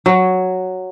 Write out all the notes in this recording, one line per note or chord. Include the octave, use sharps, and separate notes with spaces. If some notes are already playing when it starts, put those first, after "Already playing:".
F#3